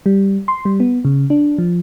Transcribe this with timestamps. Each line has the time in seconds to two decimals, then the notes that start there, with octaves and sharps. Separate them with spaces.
0.06 G3
0.48 C6
0.65 G3
0.80 B3
1.05 C#3
1.30 D4
1.58 F3